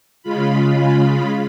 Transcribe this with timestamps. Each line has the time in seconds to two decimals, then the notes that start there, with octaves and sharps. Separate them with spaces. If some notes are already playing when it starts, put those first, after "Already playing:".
0.23 C#3 G#3 F4 B5